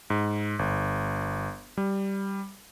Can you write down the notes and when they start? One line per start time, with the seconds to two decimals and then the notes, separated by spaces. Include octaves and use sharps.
0.10 G#2
0.59 G1
1.77 G3